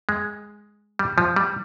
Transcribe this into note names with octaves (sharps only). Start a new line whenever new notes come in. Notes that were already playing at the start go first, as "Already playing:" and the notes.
G#3
G3
F3
G3